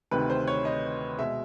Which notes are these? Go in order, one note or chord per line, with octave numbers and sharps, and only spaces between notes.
D2 C3 D#3 B4
C5
C#5
D#5
B2 G#3 E5